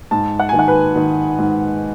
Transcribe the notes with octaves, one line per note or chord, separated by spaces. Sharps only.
G#2 A5
F#5
D#3 G#5
F#5
B4
D#3
G#2